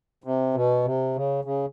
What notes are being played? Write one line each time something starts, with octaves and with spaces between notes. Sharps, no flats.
C3
B2
C3
C#3
C#3